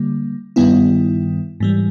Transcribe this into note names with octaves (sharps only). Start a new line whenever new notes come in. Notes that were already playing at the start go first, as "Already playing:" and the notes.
Already playing: D3 G3 A#3
G2 D#3 G3 B3 E4
G#2 E3 G3